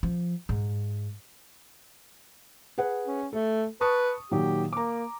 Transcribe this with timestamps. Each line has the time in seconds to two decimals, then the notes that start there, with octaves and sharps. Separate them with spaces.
0.03 F3
0.49 G#2
2.78 G#4 B4 F#5
3.07 C#4
3.33 A3 A4
3.81 B4 A5 C#6 D#6
4.31 A#2 D#3 F#3 G4
4.73 A#3 A#5 D6